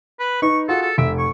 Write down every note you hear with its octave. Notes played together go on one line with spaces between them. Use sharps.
B4
D#4 B4 C#6
F4 F#4 G#4 A4
A4
F1 E5 D7
C#6